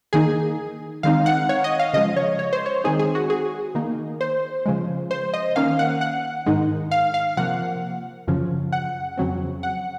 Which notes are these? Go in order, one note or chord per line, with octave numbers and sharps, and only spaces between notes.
D#3 A#3 D#4 G#4
D#3 G#3 C4 D#4 F5
F#5
C#5
D#5
F5
C#3 F3 G#3 D#5
C#5
C#5
C5
C#5
D#3 G#3 C4 D#4 G#4
G#4
F#4
G#4
D#3 A#3 D#4
C5
C#3 F3 G#3
C5
D#5
D#3 A#3 C#4 F5
F#5
F#5
G#2 D#3 G#3 D#4
F5
F5
C3 F3 A#3 F#5
F#2 C#3 F3
F#5
F2 C#3 F#3 C4
F#5